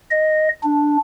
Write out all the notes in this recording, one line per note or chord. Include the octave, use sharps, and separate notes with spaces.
D#5
D4